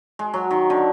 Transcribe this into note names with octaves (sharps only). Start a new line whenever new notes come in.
G#3
F#3
D#3
D3